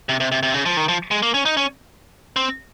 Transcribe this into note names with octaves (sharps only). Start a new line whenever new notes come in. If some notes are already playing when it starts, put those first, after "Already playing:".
C3
C3
C3
C3
C#3
F3
D#3
F3
G#3
A#3
C#4
D#4
C#4
C4